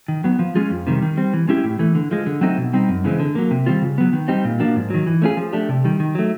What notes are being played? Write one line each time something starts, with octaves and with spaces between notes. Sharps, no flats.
D#3
F#3 B3
F3
G#3 C#4 F4 G#4
F2
C3 D#3 G3
D#3
G3 C4
E3
G#3 C#4 E4 G4
A2
E3 A3
D3
F3 G#3
D3
F#3 A3 C4 D#4
B2
G3 C4 D#4
F#2
C#3 E3 G#3 C4
D3
F#3 A#3
C3
D#3 G3 C4 F4
C#3
F#3 B3
D#3
G3 C4 D#4 G4
A#2
F3 A#3 D4 F#4
G#2
D#3 F#3
E3
A3 C#4 F4 G#4
F3
A3 D4 G4
C3
D#3 G3
D#3
F#3 A3